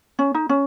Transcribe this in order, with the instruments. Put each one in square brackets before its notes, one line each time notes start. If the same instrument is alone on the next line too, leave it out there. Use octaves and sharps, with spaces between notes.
[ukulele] C#4
D#4
C#4